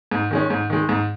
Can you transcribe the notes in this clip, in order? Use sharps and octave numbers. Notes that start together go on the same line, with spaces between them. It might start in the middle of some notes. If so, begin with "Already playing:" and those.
G#2
D#3 G#3 C#4
G#2
D#3 G#3
G#2